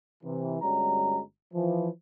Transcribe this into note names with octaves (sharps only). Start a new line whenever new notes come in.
C3 E3
G1 G3 G#3 C#4 F#4 A#5
E3 F3